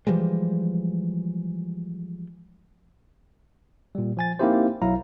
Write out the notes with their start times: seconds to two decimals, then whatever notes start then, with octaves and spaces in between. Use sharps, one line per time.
0.07 E3 F3 G3 G#3
3.95 A#2 G3
4.17 F3 G#5 A6
4.39 A#3 C4 D#4 E4 G4 C5
4.82 B1 F#3 E4 F5 A#5